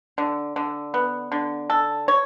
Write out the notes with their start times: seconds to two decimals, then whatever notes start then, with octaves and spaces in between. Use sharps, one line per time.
0.18 D3
0.56 D3
0.94 B3
1.32 D3
1.70 A4
2.08 C#5